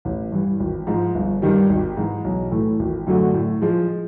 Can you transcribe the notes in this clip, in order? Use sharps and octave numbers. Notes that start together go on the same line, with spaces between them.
A1
G2 E3
G#1
G#2 F3
G1
G2 D#3 G3
G#1
G#2 E3
B1
A2 E3 A3
G#1
F#2 D3 F#3 A3
A2
F3 G#3